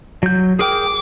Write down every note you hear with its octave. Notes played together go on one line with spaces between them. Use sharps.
F#3 G6
G#4 A#4 G5 D6